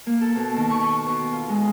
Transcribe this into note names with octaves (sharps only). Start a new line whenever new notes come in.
A#3
A4
B2
D#3
C#6
B2
F4
G#3